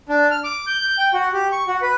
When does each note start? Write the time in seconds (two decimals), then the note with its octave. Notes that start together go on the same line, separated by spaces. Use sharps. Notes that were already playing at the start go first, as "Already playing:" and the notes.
0.09 D4
0.31 F6
0.44 D6
0.67 G6
0.81 G6
0.98 G5
1.14 F#4
1.33 G4
1.52 C#6
1.68 F#4
1.82 B4